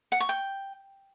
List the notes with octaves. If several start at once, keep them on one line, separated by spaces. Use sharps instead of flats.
F#5
C#6
G5